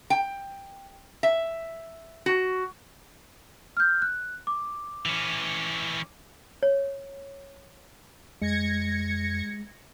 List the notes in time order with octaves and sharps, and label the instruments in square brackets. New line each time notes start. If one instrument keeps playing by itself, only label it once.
[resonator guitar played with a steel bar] G5
E5
F#4
[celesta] F6 G6
F#6
D6
[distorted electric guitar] E3 C#4
[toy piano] C#5
[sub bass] F2 [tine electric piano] G#3 [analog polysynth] G#6 A#6 C#7